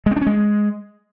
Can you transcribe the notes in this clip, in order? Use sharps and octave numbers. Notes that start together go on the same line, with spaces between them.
G#3
C4
D4
C#4
G#3